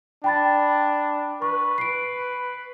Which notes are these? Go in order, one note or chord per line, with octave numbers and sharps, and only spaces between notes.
D4 G5 B5 A6
B4 C#6
C7 D7